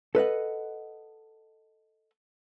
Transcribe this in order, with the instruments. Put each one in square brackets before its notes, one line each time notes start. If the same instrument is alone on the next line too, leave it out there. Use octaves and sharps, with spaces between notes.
[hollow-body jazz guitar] A4 B4 D#5 F#5